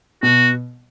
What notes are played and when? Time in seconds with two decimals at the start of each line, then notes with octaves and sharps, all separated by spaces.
0.23 B2 F#4